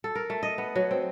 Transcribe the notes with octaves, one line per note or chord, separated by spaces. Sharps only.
A4
A#4
A3
D#5
B3
F#3
C4